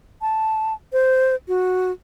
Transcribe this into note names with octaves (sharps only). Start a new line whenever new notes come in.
A5
C5
F#4